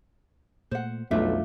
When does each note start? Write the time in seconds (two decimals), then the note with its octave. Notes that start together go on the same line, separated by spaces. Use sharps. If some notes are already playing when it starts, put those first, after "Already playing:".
0.71 A#2 A3 C5 F#5
1.11 B1 F2 G3 A3 D4 F4 E5